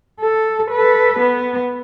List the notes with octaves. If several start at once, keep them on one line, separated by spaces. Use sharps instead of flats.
A4
A4 B4
B3